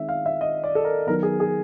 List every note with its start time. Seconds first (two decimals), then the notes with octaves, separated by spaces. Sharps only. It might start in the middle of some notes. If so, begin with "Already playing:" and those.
Already playing: D#3 G#3 C4 E5
0.09 F5
0.26 E5
0.41 D#5
0.64 D5
0.75 A4
0.85 A#4
1.07 D#3 F#3 B3 A#4
1.23 G#4
1.40 G#4